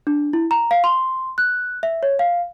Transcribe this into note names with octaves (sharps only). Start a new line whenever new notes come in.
D4
E4
A#5
F5
C6
F#6
E5
C#5
F5